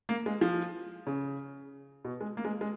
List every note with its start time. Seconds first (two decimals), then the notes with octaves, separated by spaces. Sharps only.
0.09 A#3
0.26 G#3
0.41 F3
1.07 C#3
2.05 B2
2.21 G#3
2.37 A#3
2.45 G#3
2.61 G#3